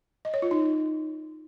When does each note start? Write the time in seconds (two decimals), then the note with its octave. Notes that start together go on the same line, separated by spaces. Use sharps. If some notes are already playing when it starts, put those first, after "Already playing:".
0.25 D#5
0.34 C#5
0.42 F4
0.51 D#4